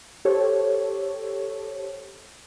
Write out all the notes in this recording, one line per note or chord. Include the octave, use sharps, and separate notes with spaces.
G4 A4 C5 C#5